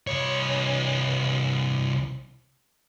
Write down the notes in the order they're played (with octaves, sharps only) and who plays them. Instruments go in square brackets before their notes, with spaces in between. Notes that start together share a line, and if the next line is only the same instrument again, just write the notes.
[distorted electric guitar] C2 C#5